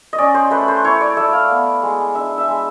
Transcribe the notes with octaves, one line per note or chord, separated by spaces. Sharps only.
D#5
C#4 D5
C5
A3 B4
C5
E4 C#5
D5
A3 E5
F5
B3
G#3
D4 E5
E5
G#3